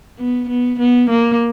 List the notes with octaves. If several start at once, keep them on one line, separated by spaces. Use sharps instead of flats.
B3
B3
B3
A#3